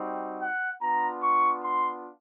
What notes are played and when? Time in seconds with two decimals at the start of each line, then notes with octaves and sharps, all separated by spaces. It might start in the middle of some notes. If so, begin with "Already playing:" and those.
Already playing: G3 C4 D#4 F#4
0.41 F#5
0.81 B3 D4 F4 A#5
1.22 C#6
1.62 C6